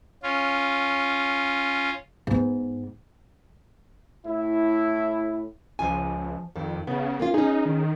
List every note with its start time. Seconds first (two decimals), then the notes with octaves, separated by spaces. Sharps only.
0.23 C#4 F4
2.27 G#2 B3
4.25 A2 E4
5.79 C#2 F3 G#5
6.56 F2 D#3
6.87 C#3 B3
7.20 A#3 C#4 F4
7.34 C#4 D#4 G#4
7.65 D#3